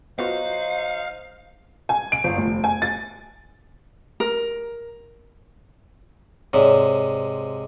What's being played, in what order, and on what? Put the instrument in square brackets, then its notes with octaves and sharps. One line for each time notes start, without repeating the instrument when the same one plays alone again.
[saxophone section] F#3 D#4 C5 [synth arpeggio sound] B3 F4 F#4 [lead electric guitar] F5
[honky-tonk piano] G#5
D7
G1
F1
G#5
A6
[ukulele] A#4
[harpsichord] G#2 C3 [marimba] C#5 D5